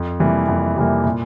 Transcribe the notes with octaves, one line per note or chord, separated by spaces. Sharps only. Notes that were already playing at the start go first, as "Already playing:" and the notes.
Already playing: F2
C3 E3 G3 A#3
F2
C3 E3 G3 A#3
A#2